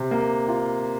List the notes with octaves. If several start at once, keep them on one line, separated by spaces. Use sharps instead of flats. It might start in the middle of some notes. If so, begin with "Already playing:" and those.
Already playing: C3
A#3
F4